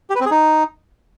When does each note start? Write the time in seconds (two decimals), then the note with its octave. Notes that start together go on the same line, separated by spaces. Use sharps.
0.10 G4
0.15 B4
0.21 C4
0.26 G#4
0.31 D#4